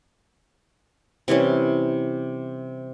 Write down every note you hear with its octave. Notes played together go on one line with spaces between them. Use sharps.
C3 E3 G3 C#4